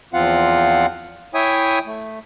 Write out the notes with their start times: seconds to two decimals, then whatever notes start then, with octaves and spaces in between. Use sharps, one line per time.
0.14 E2 F3 C4 F4 F5 F#5
1.34 E4 C#5 E5 G5 G#5 D#6
1.86 A3